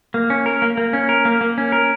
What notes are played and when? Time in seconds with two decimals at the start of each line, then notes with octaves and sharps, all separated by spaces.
0.14 A#3
0.30 C#4
0.46 A#4
0.62 A#3
0.77 A#3
0.93 C#4
1.09 A#4
1.25 A#3
1.41 A#3
1.58 C#4
1.72 A#4